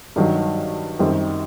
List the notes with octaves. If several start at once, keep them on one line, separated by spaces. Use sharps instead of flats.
G2 D#3 F#3
F#2 D#3 G3 C4